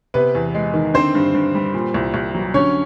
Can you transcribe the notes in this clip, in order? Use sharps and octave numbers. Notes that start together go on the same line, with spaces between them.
C3 B3 B4
E2
G#3
D#3
D3 C4 C5
G2
G2
G3
A#2
C2
C2
F#3
D3 C#4 C#5